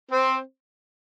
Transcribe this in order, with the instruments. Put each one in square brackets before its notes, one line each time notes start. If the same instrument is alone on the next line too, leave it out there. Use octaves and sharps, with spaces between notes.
[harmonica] C4 C5